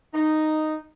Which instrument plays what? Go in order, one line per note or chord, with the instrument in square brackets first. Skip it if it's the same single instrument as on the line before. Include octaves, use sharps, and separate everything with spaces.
[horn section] D#4